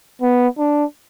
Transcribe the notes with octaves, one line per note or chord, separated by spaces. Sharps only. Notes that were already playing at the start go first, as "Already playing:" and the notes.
B3
D4